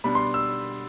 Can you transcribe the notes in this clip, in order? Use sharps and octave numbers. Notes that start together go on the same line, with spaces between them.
B2 G3 D4 B5
C6
E6